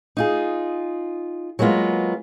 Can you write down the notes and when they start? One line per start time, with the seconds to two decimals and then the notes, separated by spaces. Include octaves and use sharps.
0.17 D#4 F4 G#4
1.59 F#3 G#3 A#3 B3 F4